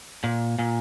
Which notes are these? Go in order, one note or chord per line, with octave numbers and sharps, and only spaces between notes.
A#2
A#2